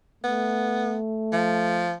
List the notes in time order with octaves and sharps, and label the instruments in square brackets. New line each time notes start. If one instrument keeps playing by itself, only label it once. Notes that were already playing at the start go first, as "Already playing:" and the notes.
[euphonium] A3 [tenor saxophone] B3
[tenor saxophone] F3